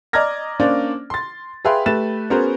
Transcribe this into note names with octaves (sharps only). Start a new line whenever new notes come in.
D5 D#5 A#5 F6 G#6 A#6
A#3 C#4 D4 C5 D5
C6 A6
G#4 B4 E5 F5 G5 C6
A3 G4 B4 A6 E7
B3 C#4 F#4 G#4 A#4 C5